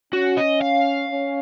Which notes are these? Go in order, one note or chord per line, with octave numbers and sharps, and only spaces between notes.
C#4 F#4
D#5
F5
C#4